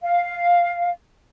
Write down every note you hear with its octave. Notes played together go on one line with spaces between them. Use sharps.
F5